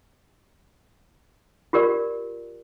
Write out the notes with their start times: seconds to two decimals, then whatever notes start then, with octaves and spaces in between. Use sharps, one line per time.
1.73 F4 G4 A#4 D5